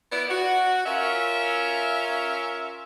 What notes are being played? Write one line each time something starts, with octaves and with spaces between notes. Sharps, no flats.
B3 E4 D5
F#4
C#4 F4 A#4 E5